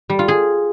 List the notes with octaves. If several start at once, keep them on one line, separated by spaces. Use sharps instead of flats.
G3
F4
G#4